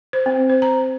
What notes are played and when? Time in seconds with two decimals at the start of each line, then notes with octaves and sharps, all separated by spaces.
0.13 C5
0.26 C4
0.50 C5
0.62 A#5